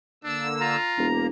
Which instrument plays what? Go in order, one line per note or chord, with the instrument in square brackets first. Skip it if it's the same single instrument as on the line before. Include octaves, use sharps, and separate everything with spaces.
[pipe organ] D3 A#3 E6 [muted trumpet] D4
[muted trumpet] F4 [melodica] A#5
[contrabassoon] E1 [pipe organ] A#3